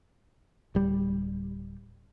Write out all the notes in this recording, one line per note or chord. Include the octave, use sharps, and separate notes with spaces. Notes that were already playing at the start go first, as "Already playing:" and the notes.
D1 G3